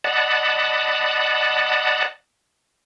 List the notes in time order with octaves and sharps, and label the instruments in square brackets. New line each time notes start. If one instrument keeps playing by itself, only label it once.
[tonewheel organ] D5 D#5 F#5 A5 B5